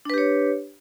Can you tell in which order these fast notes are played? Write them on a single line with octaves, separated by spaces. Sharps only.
D4 B4 G4 C#5